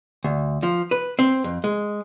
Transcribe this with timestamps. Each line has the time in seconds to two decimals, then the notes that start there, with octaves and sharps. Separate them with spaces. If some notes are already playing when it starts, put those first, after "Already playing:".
0.24 D2
0.63 F3
0.91 B4
1.19 C4
1.44 F2
1.64 G#3